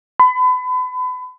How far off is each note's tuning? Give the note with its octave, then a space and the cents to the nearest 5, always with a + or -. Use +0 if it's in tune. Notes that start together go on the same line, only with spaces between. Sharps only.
B5 +35